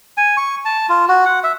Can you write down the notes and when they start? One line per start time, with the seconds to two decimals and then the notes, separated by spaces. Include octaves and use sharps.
0.17 G#5
0.37 C#6
0.65 A5
0.89 F4
1.09 F#4
1.25 F#5
1.44 E5